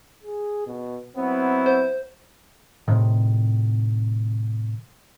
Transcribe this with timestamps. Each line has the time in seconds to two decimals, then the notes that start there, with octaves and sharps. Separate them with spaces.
0.23 G#4
0.67 B2
1.16 F#3 B3 C4 E4
1.66 C5
2.88 A2 C3 D#3